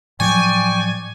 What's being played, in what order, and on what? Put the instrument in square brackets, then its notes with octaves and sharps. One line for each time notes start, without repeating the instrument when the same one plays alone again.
[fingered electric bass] A2 F3 F#3 [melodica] D5 G5 C#6 [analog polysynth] G#5